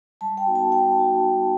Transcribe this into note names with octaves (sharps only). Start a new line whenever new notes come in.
G3 A5
G5
B3 D#4 F#4
A5
G3 G5
B3 D#4 F#4
G3